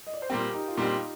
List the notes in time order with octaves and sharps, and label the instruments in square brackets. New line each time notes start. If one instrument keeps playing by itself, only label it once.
[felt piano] D#5
D5
C5
[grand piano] A#2 G3 C4 [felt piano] G4 A#4
[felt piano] D#4 G4
F4
[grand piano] A#2 G3 C4 [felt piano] D#4 G4